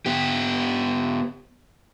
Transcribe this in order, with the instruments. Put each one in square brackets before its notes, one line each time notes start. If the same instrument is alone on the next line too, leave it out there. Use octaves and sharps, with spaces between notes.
[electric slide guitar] B3 G4